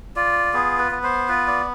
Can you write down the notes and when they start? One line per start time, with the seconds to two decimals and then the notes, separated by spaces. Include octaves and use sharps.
0.16 F4 D5
0.54 B3 G#4
0.79 B4
0.92 B3
1.03 C5
1.28 F4 B4
1.47 D5